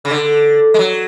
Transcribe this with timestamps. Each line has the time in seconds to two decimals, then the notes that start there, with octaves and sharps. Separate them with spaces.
0.05 C#3
0.11 D3
0.74 G#3
0.79 F#3